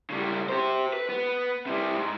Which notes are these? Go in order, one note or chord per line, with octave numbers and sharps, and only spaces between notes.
C#3 G3
G4 C5
B4
B3
C3 G3
G#2